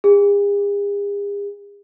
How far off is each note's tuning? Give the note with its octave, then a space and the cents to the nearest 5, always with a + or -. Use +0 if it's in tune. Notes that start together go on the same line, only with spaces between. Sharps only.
G#4 -45